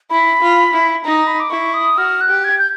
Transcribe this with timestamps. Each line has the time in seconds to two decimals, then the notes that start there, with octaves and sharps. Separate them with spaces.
0.10 E4 B5
0.41 F4
0.73 E4
1.04 D#4 A#5
1.27 B5
1.40 D6
1.50 E4 C#6
1.74 D#6
1.97 F#4 F6
2.21 F#6
2.29 G4
2.44 G#6
2.58 G6